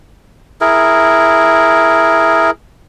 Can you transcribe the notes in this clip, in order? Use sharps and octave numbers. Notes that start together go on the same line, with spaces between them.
E4 G#4 A#4